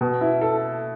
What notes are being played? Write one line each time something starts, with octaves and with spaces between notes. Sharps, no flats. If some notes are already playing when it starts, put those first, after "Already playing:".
B2
E4
A4